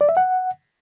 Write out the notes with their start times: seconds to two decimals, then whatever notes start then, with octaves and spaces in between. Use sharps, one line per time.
0.01 D5
0.09 E5
0.17 F#5